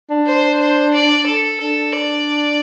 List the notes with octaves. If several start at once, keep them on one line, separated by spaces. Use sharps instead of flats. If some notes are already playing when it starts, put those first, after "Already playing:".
D4
C5
C5
D5
A4
D4 A4
D5